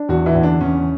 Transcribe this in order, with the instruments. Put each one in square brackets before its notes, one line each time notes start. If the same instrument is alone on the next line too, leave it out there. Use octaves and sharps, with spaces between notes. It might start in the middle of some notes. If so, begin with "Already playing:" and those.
Already playing: [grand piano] D4
[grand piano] E2 [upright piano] F#3 F#4
[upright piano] E3 E4
[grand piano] E2
[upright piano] D3 D4
[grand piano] E2 [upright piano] C#3 C#4